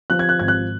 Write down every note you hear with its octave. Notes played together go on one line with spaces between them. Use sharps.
F3 F#6
G#6
F#6
G#1 G#6
F#6